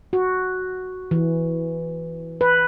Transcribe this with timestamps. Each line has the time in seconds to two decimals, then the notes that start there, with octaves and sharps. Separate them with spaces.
0.13 F#4
1.11 E3
2.41 B4